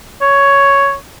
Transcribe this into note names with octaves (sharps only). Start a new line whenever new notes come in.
C#5